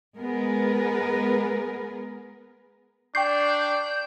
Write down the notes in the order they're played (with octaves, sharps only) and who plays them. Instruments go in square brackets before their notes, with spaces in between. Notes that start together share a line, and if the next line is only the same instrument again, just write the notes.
[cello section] G#3 B3 G#4 A#4 B4
[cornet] D4 [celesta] G5 C#6 C7 [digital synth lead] G6